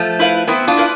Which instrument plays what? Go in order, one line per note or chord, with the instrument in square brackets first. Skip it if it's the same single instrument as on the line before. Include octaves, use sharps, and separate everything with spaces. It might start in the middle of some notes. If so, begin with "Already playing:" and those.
Already playing: [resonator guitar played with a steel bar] F3 A3
[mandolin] E4 B4 F5
[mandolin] B3 [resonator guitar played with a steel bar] C4 E4
[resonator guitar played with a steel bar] D4 F4
[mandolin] E4 B4 F5